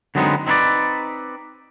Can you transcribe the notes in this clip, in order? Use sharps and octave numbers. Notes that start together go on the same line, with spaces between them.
D3 F#3 G#3 B3 C4 D#4
C4 D#4 E4 B4 D5